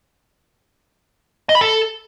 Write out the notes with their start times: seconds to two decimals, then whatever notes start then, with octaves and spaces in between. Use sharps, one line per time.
1.49 D#5
1.55 B5
1.61 A4